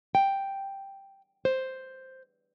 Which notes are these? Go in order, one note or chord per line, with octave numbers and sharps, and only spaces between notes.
G5
C5